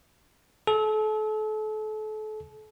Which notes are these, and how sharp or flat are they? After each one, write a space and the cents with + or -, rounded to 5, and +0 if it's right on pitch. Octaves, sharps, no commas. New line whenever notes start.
A4 -35